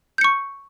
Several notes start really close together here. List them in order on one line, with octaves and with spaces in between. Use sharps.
G6 C#7 C#6